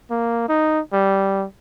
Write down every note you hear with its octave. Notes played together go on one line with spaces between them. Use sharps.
A#3
D#4
G3